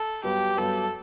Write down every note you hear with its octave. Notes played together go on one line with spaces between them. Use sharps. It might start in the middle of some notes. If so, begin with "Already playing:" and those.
Already playing: A4
G2 F#3 B3 G4
G2 F#3 B3 A4